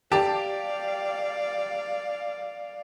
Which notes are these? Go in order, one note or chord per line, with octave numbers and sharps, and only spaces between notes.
G4 D5 F5 A5